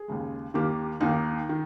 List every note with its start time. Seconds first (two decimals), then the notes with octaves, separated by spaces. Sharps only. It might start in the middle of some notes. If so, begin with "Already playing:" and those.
Already playing: G#4
0.08 D#2 C#3 G#3
0.54 D#2 D#3 A#3 G4
1.00 D#2 D#3 A#3 D#4
1.49 D#3